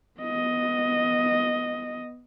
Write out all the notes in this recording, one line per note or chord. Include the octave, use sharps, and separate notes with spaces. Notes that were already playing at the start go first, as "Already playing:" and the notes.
B3 D#5